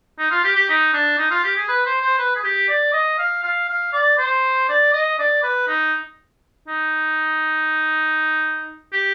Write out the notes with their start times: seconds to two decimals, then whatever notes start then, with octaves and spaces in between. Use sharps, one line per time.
0.19 D#4
0.31 F4
0.44 G4
0.56 G4
0.69 D#4
0.93 D4
1.18 D#4
1.31 F4
1.44 G4
1.56 G#4
1.69 B4
1.86 C5
2.02 C5
2.18 B4
2.36 G#4
2.44 G4
2.69 D5
2.93 D#5
3.19 F5
3.43 F5
3.69 F5
3.93 D5
4.18 C5
4.69 D5
4.93 D#5
5.19 D5
5.43 B4
5.68 D#4
6.68 D#4
8.92 G4